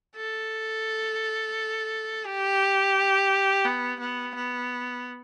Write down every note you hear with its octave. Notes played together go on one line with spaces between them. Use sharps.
A4
G4
B3
B3
B3